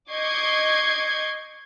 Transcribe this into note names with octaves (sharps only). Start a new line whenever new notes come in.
D#5 C#6 D6 G6 G#6 C7